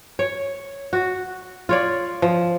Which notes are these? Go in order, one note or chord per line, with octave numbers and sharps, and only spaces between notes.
C#5
F#4
F4 C#5 D5
F3